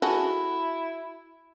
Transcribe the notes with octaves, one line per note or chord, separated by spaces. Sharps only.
E4 F#4 G#4 A4